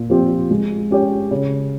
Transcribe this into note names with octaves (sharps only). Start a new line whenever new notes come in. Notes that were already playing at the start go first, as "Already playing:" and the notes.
Already playing: A#2
F3 C4 G4
G#3
C#4 G4 C#5
C#3